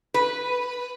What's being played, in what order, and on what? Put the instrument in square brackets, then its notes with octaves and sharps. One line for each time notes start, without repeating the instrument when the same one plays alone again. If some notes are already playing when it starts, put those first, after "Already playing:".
[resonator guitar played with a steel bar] B4